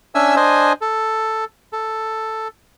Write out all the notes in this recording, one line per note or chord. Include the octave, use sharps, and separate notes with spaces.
C#4 D4 E5 G#5 E6
D4 C5 D#5 G#5
A4
A4